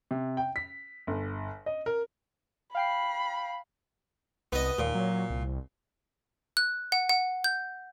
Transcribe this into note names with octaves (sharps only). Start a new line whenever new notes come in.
C3
G5
B6
G1
D#5
A#4
F5 G5 B5 C7
C2 B3 D#5
D#2 A#2
F#3
C2
F#6
F#5
F#5
G6